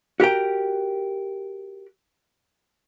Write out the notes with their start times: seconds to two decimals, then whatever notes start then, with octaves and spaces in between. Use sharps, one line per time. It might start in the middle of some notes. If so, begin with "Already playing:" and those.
0.20 F#4 G4 A#4 G5